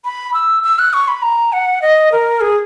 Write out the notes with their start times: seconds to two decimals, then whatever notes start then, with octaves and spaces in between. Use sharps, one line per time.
0.05 B5
0.34 E6
0.63 E6
0.79 F#6
0.93 C#6
1.08 B5
1.22 A#5
1.53 F#5
1.82 D#5
2.12 A#4
2.41 G#4